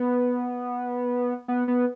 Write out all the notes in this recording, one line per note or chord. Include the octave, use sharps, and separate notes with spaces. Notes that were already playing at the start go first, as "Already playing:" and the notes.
Already playing: B3
B3
B3